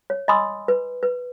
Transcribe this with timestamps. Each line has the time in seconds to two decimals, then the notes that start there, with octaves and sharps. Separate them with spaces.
0.10 C#5
0.28 D#5 G#5 B5 C6 D#6 E6
0.68 B4
1.03 B4